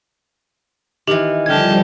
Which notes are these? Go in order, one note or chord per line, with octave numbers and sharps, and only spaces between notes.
D#3 E3 G4 F#7
D3 F3 G3 G4 A5 F6 G#6